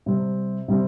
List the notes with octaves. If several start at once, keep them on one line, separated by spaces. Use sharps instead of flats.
C3 G3 C4
C3 G3 C4